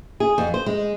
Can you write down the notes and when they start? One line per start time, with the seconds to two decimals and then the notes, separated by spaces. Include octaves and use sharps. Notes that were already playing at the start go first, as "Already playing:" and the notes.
0.20 G#4
0.38 F2
0.54 C5
0.66 G#3